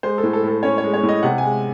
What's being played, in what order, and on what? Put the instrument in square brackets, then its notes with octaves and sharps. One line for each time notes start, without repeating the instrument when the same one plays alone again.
[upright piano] G#3 C5
A4
A2
A4
A2 A4
C#4 C#5
C#5
G#3
C#5
A2
D#5
C3 F#5
G#3 G#5